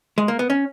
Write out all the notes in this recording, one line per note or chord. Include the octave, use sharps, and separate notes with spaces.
G#3
A#3
B3
C#4